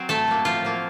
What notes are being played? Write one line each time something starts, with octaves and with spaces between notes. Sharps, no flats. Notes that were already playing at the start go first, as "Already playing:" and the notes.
Already playing: F#3 C4
A2 A3 A4
F#3 A#3
A2 F3 F4
F#3 A#3